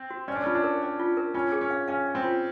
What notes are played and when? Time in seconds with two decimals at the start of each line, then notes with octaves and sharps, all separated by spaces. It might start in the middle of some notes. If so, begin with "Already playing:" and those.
Already playing: C4
0.10 F#4
0.28 C#4 D5
0.35 D4
0.44 C#4 F4
0.55 D4
0.64 A#4
0.82 D5
1.00 F4
1.17 A#4
1.34 C#4 F4
1.52 G#4
1.61 C#4
1.70 F5
1.88 C#4 F5
2.06 F5
2.15 C4
2.24 F4